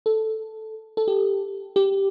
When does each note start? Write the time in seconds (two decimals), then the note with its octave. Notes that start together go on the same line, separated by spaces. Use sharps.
0.06 A4
0.97 A4
1.08 G4
1.76 G4